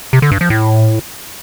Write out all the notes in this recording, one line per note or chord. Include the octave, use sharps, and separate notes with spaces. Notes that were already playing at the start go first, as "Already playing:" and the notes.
C3
D3
G2
F3
A2